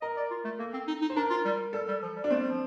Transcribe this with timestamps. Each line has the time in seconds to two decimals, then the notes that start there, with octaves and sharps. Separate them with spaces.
0.02 A#4 D#5
0.17 D5
0.31 F4
0.45 A3
0.59 A#3 A4
0.73 C4
0.88 D#4
1.01 D#4
1.10 C5
1.16 D4 A#4
1.30 F4
1.45 G3
1.73 G3 A4
1.88 G3
2.02 F3
2.16 G3
2.24 D4
2.30 A3 C4
2.40 G3
2.50 F3